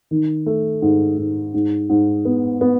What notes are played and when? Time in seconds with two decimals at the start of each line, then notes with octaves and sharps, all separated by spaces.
0.11 D#3
0.46 A3
0.82 G#2
1.18 G#2
1.54 G#2
1.89 G#2
2.25 B3
2.61 B3